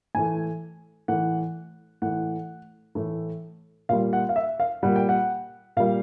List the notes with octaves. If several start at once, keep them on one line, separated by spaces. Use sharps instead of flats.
A2 E3 A3 G#5
A2 E3 A3 F#5
A2 E3 A3 F#5
A2 E3 A3
A#2 G3 F5
F#5
F5
E5
F5
A#2 G3 F#5
G5
F#5
A#2 G3 F5